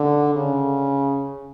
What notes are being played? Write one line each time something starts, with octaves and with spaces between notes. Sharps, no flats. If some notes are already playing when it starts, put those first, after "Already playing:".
Already playing: D3
C#3